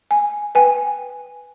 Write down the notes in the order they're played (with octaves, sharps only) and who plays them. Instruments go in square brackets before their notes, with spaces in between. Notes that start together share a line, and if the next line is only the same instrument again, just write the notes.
[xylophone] G#5
B4 G5 G#5